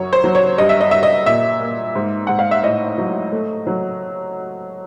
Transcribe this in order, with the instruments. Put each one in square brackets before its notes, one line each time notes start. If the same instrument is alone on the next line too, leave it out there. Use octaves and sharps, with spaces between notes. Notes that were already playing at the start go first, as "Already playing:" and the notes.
Already playing: [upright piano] F#2 F#3 C#5
C5
F#3
C#5
G2 D#5
E5
D#5
G2 E5
D#5
A#2 E5
A#3
G#2
G#2 F#5
F5
E5
A2 D#5
F#3
A3
F#3